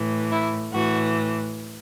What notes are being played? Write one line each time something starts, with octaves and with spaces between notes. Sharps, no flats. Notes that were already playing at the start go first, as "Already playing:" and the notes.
Already playing: A2 E3
E4
A2 E3 F#4